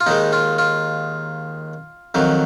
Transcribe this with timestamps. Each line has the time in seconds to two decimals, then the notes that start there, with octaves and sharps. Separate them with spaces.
0.01 F4
0.06 D#2 D#3 G#3 D#4
0.33 F4
0.58 F4
2.14 F2 D#3 F#3